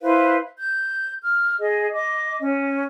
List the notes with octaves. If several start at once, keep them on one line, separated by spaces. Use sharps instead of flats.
E4 B4 C5 F5
G6
F6
G#4 D#5
D#5 D6
C#4